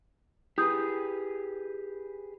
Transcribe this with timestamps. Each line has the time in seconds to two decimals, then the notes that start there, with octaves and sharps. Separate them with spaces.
0.58 E4 G4 G#4 B4 D#6 G6